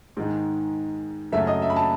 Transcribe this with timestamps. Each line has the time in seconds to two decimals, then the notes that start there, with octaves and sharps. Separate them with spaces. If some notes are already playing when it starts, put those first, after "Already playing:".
0.17 G#2 D#3 G#3
1.32 F#2 C#3 F#3 A3 E5
1.47 D#5
1.62 E5
1.70 B5
1.76 A5